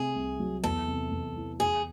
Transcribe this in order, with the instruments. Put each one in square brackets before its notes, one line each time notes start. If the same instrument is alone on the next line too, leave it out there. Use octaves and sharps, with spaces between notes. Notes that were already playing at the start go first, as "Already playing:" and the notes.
Already playing: [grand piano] C3 A3 C4 [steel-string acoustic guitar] G#4
[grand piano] C2
F#3
[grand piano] E2 [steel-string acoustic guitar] A4
[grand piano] C3
E2
E3
[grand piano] E2 [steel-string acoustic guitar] G#4